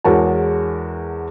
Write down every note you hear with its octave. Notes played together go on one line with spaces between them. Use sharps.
E2 G#3 F#4 A#4 C#5 A5